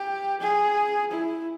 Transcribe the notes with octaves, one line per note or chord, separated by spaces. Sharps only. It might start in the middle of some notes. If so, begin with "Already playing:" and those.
Already playing: G4
G#4
E4